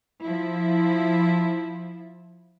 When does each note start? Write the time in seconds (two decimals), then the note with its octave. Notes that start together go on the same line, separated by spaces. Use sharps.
0.22 F3 E4